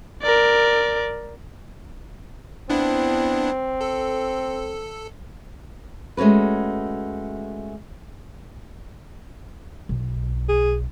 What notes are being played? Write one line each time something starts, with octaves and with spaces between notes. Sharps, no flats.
A#4 D5
B3 C4 D4 E4
A4
G#3 A3 C#4 F#4 B4
B1
G#4